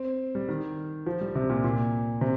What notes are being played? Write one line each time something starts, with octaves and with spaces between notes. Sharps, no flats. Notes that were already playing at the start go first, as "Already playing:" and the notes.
Already playing: C4
G3
D#3
F3
G3
C3
A#2
A#2
C3